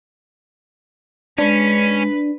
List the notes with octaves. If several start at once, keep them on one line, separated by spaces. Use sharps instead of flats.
G#3 C#4 D4 B4